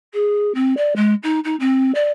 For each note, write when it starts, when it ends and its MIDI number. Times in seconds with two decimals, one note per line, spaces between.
0.13 0.54 68
0.54 0.74 60
0.77 0.93 74
0.96 1.14 56
1.22 1.39 63
1.44 1.55 63
1.59 1.91 60
1.94 2.11 74